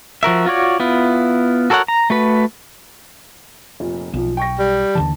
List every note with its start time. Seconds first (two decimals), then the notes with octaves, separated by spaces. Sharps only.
0.23 F3 F#4 A#4 E5
0.46 F4 F#4 C#5 D5
0.80 B3 E4 F4
1.70 F#4 A4 A#4 C#5 F#5
1.88 A#5
2.10 A3 F#4 B4
3.80 F1 A#2
4.14 B1 A#2 F3
4.37 G5 C#6 A#6
4.59 G3
4.95 D#2 D3 E3 A5